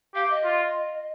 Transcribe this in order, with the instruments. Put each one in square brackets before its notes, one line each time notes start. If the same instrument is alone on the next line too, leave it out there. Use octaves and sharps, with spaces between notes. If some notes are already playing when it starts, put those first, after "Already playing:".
[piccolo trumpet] G4 [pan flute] F5
[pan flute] D#5
[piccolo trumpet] F4